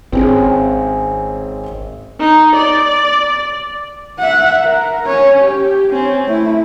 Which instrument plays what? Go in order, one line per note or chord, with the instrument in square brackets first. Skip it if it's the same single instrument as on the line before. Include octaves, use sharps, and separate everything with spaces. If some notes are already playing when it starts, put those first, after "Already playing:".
[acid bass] G#1 [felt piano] C4 C#4 G#4
[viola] D#4
D5
[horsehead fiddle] E5 F#5
A#4
C#4 C#5
G4
C4 C#4
A3 E4